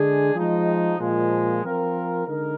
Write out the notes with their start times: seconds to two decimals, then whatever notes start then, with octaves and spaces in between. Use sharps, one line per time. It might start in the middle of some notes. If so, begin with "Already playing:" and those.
Already playing: D3 G#3 D4 G#4
0.35 F3 G#3 D#4
0.99 A#2 F3 G#3
1.63 F3 C4 F4 A#4
2.27 D3 G#3 D#4 A#4